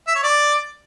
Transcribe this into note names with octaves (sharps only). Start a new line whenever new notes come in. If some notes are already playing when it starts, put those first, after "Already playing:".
E5
C#5
D5